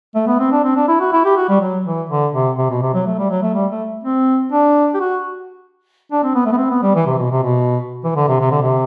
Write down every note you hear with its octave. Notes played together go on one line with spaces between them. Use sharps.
A3
B3
C4
D4
C4
D4
E4
F#4
E4
G4
F#4
G3
F#3
E3
D3
C3
C3
B2
C3
F#3
A3
G3
F#3
A3
G3
A3
C4
D4
G4
F#4
D4
C4
B3
A3
B3
C4
B3
G3
E3
C3
B2
C3
B2
E3
D3
C3
C3
D3
C3